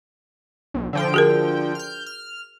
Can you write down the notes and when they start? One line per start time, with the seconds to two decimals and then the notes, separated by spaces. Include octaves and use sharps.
0.74 B1
0.93 D3 F3 G5
1.14 F#4 G#4 A#4
1.75 F6 G6
2.06 F6